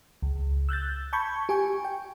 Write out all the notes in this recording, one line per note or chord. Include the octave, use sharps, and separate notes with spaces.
C#2
E6 F#6 G6 A6
A5 B5 C#6 G6 G#6
G4 G#5 C#6
G5